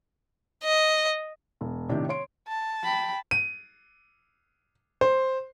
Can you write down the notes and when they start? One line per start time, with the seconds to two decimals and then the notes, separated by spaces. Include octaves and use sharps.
0.64 D#5
1.61 E1
1.89 A2 C3 D#3 D4 G4
2.09 C#5 C6 D7
2.48 A5
2.83 G5 B5
3.31 D#7
5.01 C5